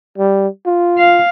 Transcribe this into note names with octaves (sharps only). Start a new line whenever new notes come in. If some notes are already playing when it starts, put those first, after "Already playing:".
G3
F4
F5